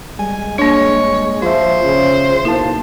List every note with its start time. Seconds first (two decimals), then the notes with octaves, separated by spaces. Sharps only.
0.19 G3 G#3 G#5
0.58 A#3 D4 C#5
1.42 F3 F4 C5 E5
1.84 C#3
2.45 B1 A#3 E4 A5